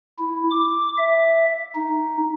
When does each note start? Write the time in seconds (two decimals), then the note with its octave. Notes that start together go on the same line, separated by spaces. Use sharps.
0.18 E4
0.51 D6
0.98 E5
1.75 D#4